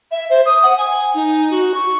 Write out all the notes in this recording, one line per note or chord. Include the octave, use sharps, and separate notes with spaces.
E5
C5
D#6
F#5
G#5
D#4
F#4
C#6